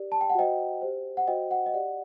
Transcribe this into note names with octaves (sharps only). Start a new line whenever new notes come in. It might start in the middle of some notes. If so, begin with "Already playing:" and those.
Already playing: G4 A#4 D5
A5
G5
F#5
F#4 C5 D#5 G5
G4 C5
F#5
F#4 C5 D#5 G5
F#5
D#5
G4 D5 F#5